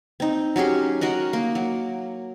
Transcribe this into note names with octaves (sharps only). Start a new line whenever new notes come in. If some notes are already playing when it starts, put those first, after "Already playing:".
C4 D#4
F#3 C#4 G4 G#4
F#4 A#4 D#5 F#5
A#3
F#3